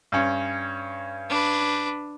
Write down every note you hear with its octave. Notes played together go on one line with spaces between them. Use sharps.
G2 C#4
D4 B4